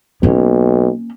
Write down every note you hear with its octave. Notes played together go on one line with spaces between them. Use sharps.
B1 A#3 C#4